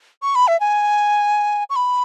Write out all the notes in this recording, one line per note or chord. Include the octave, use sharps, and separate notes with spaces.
C#6
B5
E5
G#5
C#6
B5